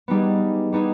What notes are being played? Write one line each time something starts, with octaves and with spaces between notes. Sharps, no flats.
G3 B3 D#4 G#4
G3 B3 D#4 G#4